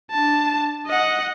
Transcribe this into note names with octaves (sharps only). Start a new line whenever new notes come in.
D4 A5
D#5 F#5